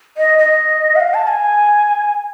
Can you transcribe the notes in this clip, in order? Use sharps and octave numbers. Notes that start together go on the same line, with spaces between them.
D#5
D#5
F#5
F5
A5
G#5